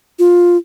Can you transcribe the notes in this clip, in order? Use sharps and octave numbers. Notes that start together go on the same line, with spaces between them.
F4